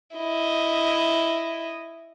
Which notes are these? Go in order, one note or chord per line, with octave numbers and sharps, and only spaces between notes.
E4 D#5